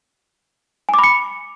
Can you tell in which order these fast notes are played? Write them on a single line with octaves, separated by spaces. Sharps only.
G#5 D6 B5 C#7